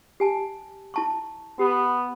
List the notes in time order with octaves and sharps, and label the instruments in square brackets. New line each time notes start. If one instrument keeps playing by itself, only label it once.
[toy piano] G4 G#5 A5
E4 A5 C#6
[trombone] B3 [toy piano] G4